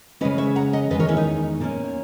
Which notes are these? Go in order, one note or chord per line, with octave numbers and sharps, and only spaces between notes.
C#3 G#3 C#4 B4 D#5
C#5 E5
F#5 A#5
D#5 F#5
E2 D#3 G#3 B4 D#5
A#4 C#5
C#4 E4
D#4
A#2 A#3 C#4